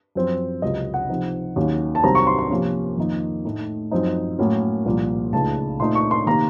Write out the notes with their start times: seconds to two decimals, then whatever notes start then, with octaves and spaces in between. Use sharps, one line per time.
0.15 F#2 F3 C4
0.62 C#2 C3 F#3 D#5
0.94 F#5
1.09 C3 F3 C4 D#4
1.56 D#2 D#3 F#3 A#3 C#4
1.95 A5
2.03 C2 C3 D#3 F#3 C4 A#5
2.15 C#6
2.27 C6
2.38 C6
2.50 C3 F3 A#3 C#4
2.97 F2 D#3 A#3 D#4
3.45 A2 A3 D#4
3.91 F#2 F3 C4 D#4
4.39 A2 F#3 A#3 C#4
4.85 C2 A#2 F3 A#3
5.33 C#2 C#3 A3 D#4 A5
5.80 A#2 A3 C4 D#4 C6
5.95 C#6
6.11 C6
6.26 C3 D#3 A#3 A#5